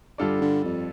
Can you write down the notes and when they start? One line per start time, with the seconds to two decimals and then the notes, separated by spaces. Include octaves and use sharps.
0.18 G2 D3 G3 F4 A4 D5
0.41 D3
0.64 F2